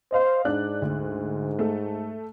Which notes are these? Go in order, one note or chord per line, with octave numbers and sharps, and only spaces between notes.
C5 D#5 F5
G#2 D4 F#6
D2
A3 A4